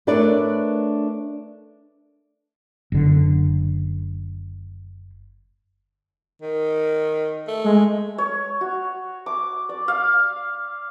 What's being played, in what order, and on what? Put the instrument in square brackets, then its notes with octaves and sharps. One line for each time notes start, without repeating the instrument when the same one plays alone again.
[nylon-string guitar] A3 D4 A#4 B4 C#5 D5
[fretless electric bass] F#1 D3
[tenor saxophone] D#3
A3
[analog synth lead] G#3
[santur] C#5
F#4
D6
D5
F5